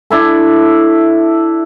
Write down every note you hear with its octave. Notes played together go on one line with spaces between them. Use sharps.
D4 E4 A4